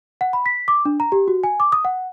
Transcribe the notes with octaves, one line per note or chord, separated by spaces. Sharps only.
F#5
B5
B6
D6
D4
A#5
G4
F#4
G#5
D6
D#6
F#5